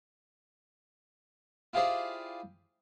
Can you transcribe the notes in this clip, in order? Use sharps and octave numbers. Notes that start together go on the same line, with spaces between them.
E4 F4 G4 G#4 C5 D5